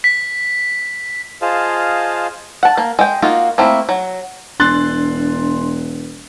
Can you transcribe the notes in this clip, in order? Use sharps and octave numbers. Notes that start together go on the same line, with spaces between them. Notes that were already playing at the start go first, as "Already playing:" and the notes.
B6
F4 G#4 C5 D#5 F5 A5
F#5 A5
A#3
G#3 G5
A#3 D#4 F4 F#4
A3 A#3 C4 E4
F#3
E1 D4 C6 F#6 A6